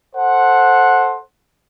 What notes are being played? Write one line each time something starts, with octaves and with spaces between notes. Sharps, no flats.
A4 C5 F#5